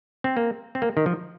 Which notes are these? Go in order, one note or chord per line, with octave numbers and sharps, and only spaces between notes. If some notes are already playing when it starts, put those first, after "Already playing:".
C4
A#3
C4
A#3
D#3
F3